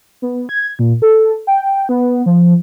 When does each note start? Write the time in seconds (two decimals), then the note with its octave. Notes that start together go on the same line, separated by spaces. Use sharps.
0.22 B3
0.49 G#6
0.79 A#2
1.02 A4
1.47 G5
1.89 B3
2.26 F3